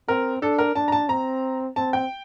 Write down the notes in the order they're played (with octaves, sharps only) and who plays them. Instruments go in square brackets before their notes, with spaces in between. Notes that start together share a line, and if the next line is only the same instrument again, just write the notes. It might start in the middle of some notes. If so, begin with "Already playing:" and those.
[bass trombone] C4 [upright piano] A#4
[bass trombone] D4 [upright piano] A4
[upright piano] A#4
[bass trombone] D4 [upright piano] A5
[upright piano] A#5
A5
[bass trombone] C4 [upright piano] A#5
[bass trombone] C4 [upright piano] A5
[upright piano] G5